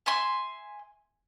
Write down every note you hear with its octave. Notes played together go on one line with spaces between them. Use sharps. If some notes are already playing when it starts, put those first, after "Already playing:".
E5 G#5 C6